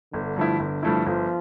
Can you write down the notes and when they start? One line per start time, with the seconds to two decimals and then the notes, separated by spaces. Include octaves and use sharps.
0.13 G1 D3
0.37 G2 F3 A3 E4
0.59 G1
0.83 G2 F3 A3 E4
1.05 G1 F3